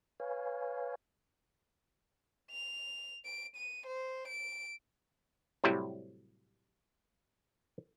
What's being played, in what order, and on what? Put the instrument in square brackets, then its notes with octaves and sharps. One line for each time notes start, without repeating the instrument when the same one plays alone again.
[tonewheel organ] B4 C#5 F5 G#5
[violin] F7
D7
D#7
C5
D7
[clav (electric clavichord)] A2 C3 F#3 G3 E4